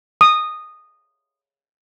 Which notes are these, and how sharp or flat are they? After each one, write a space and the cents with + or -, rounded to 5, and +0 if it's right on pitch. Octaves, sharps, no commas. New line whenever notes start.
D#6 -15